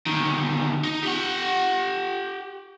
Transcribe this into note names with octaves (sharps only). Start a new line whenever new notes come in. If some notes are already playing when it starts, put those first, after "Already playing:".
D2 D#3
D#4
G4 F#5